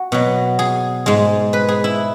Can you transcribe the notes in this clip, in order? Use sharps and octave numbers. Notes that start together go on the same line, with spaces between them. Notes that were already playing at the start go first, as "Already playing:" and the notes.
Already playing: F#4
B2 F#3
G#4
G#2 G#3
B4
G#4
E4